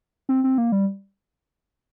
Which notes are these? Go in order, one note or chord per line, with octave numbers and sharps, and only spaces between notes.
C4
C4
A#3
G3